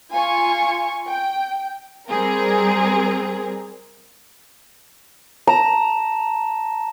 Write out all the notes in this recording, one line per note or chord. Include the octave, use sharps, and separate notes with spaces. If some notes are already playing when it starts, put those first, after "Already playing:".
F4 G#5 C#6
G5
G3 C4 G#4 A#4
A5 A#5 E7